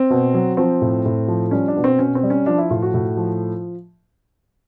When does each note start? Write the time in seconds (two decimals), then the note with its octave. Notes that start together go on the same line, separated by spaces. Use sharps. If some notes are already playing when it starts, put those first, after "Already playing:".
Already playing: C4
0.10 B2
0.34 F#3
0.57 F3 C4
0.82 A2
1.05 A2
1.28 F3
1.51 G3 C#4
1.68 D4
1.76 B2
1.84 C4
1.99 B2 C#4
2.15 C4
2.23 G3
2.30 C#4
2.46 F3 D4
2.58 E4
2.71 A2 F4
2.82 F#4
2.94 A2
3.17 F3